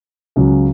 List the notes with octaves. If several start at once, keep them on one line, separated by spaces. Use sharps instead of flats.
C#2 C#3 F#3